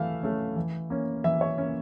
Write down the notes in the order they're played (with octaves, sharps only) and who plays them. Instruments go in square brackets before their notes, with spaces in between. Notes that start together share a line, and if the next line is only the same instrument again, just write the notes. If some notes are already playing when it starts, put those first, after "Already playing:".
Already playing: [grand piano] E3 A3 E5 F5
A3 C#4
E3
A#3 C#4
E3 E5
C#5
A#3 C#4